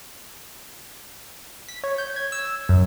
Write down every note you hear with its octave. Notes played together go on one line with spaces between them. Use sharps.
B6
C#5
G6
G#6
E6
F#2